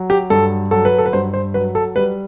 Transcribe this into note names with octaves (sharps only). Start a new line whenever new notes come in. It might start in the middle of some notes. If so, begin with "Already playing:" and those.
Already playing: F#3
G4
G2 A4
F#3 A4
B4
A4
B4
G2 C5
C5
F#3 B4
A4
G3 B4